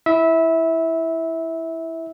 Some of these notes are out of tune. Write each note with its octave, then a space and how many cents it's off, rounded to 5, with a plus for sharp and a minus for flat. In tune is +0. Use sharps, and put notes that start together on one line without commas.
E4 +0 E5 -20